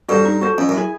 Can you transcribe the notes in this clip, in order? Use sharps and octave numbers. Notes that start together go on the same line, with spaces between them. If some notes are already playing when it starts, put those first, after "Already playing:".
G2 F#4 A4 C5
D#4
F#4 A4 C5
F2 C#4
F#2
E4 G#4